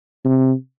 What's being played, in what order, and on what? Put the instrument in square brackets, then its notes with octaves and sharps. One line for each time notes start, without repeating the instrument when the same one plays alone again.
[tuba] C3